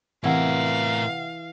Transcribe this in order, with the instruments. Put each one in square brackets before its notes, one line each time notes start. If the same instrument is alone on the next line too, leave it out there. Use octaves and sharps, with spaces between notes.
[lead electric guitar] A2 A#4 [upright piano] C3 F#5 [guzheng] E3 [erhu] F5